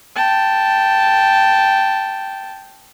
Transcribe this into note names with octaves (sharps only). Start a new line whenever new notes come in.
G5 A5